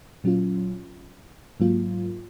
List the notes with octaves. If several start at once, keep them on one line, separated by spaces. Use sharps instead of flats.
A#2 F#3 C#4 F4
G#2 F#3 A#3 F4